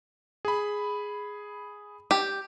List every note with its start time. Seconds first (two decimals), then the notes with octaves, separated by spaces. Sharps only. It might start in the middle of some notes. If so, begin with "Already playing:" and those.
0.45 G#4 B5
2.11 G4